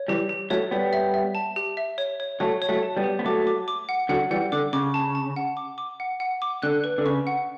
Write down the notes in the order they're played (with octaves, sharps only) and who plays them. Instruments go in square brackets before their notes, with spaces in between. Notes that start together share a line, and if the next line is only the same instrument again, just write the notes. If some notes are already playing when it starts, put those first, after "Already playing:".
Already playing: [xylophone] C#5
[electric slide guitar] E3 G3 [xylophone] G4
[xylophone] G4
[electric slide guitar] F#3 A3 [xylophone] C#5
[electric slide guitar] G3 B3 [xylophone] C#5
[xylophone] E5
E5
A5
G4
E5
C#5
C#5
[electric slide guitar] F#3 A3 [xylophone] C#5
[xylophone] C#5
[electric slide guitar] F#3 A3
[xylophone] A5
[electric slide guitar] G3 B3
[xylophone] G4
[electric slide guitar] B3
[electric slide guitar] F#3 A3 [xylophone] D6
[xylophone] D6
D6
F#5
[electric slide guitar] D3 F#3 [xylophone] F#5
[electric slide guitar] E3 G3 [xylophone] F#5
[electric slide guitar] D3 [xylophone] D6
[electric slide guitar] C#3 [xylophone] D6
[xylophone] A5
A5
F#5
D6
D6
F#5
F#5
D6
[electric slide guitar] D3 [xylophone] F#6
[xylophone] B4
[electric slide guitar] D3
[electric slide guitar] C#3 [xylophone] C#6
[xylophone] F#5